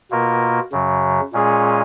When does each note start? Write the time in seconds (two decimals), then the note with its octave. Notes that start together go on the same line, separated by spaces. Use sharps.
0.11 B2 A#3 F4 A#4
0.72 F#2 C#3 F#3
1.33 A#2 G#3 C#4 F4 G#4